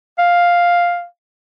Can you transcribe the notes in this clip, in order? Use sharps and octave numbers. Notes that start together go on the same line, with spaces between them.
F5